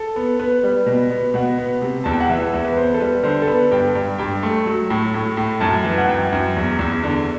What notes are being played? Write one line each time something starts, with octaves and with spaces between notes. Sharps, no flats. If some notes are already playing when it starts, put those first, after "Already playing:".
Already playing: A4
B3
B3 B4
G3
B2
B3
B2 F#5
B3
C3
E2 A5
G5
F#5
E3 E5
E2
B4
B3 C5
A4
G3 B4
D3 C5
A4
B3 B4
G2 G5
G2
G2 G5
A3
F#3
A2
A2
A2
F#2 A5
E3
F#5
F#2 G5
F#2
E2
E2
D3